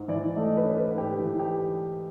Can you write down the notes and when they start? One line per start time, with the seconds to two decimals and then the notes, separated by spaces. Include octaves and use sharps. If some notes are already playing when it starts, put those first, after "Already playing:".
Already playing: G#2
0.08 E3 D5
0.36 A3 D#5
0.57 B4
0.64 C#4
0.77 B4
0.91 G#2
0.98 G4
1.18 E3
1.39 G4